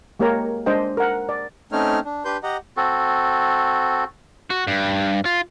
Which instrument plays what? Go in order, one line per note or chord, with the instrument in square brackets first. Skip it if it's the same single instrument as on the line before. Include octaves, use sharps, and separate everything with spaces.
[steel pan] G#3 A#3 G4 A#4 C#5 A#5
G#3 D4 C5 D#5 G5
A#4 F#5
D5
[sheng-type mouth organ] A3 C4 C#4 D#4 C#5 F6
D4
D4 G4 B4 C6 G6
G4 D#5 F#5 A#5
[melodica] C4 F#4 A4
[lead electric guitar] F#4
G2
F4